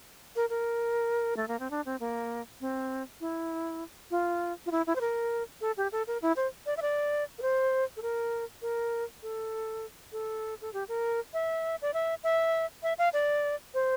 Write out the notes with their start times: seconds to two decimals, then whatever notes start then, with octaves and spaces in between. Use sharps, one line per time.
0.36 A#4
0.50 A#4
1.37 A3
1.48 A#3
1.60 C4
1.71 D4
1.86 C4
2.00 A#3
2.61 C4
3.21 E4
4.11 F4
4.66 F4
4.71 E4
4.87 E4
4.96 C5
5.01 A#4
5.61 A4
5.77 G4
5.92 A4
6.07 A#4
6.22 E4
6.36 C5
6.66 D5
6.77 E5
6.82 D5
7.39 A#4
7.42 C5
7.97 A4
8.02 A#4
8.62 A#4
9.23 A4
10.12 A4
10.62 A4
10.73 G4
10.89 A#4
11.34 E5
11.82 D5
11.94 E5
12.24 E5
12.83 E5
12.99 F5
13.13 D5
13.74 C5